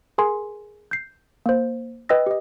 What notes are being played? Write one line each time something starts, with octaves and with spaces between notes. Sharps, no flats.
G#4 A#4 G#5 C6
G6 C7
A#3 C5
B4 D#5 G5 E6 A#6
G4 D#5